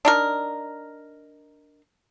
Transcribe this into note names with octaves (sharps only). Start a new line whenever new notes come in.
D4 D#4 A#4